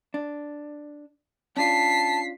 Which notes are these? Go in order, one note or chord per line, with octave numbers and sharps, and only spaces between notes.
D4
C#4 D4 F4 A5 B6 C7